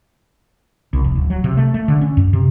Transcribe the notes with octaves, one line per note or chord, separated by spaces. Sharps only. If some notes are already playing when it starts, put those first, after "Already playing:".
C2
F1
D1
F#3
C3
A3
A3
D3
C#4
F#2
C3